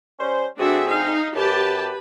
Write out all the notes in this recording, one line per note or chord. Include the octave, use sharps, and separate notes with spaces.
G3 C#4 C5
D2 C4 D4 F#4 G#4 E5
D#4 F5
F#2 G4 B4 A5